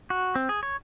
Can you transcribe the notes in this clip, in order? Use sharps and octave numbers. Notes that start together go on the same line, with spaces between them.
F#4
C4
G#4
C#5